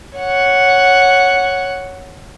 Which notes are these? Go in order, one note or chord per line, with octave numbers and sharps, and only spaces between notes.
C#5 F#5